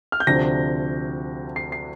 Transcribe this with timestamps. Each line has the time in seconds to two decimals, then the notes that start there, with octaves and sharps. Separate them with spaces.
0.12 F6
0.20 G6
0.27 D2 C3 F3 D4 A#6
1.56 C7
1.72 C7